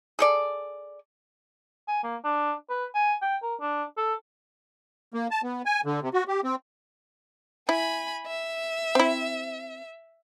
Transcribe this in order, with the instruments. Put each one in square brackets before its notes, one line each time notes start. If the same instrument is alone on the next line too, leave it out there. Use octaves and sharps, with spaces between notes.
[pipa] G#4 A4 D5
[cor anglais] G#5
A#3
D4
B4
G#5
G5
A#4
D4
A4
[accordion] A#3
A5
B3
G#5
D3
C3
F#4
G4
C4
[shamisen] E4 [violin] G#5 B5
[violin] E5
[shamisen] C4 E4